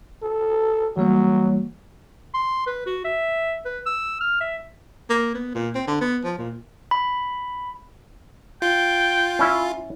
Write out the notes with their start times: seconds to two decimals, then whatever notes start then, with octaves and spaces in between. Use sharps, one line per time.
0.23 A4
0.97 E3 F#3 G3 A#3
2.34 C6
2.66 B4
2.86 F#4
3.05 E5
3.65 B4
3.86 E6
4.21 F6
4.41 E5
5.10 A#3
5.34 B3
5.54 A#2
5.75 C4
5.87 D3
6.01 B3
6.24 F3
6.38 A#2
6.91 B5
8.62 F4 G5
9.39 C#4 E4 E5